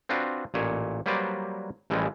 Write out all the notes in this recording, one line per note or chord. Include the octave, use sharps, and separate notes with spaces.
C4 D4 F4 F#4 B4
A1 A#2 C#5
F#3 G3 A#3 B4 C5 D5
A1 E3 F3 G3 G#3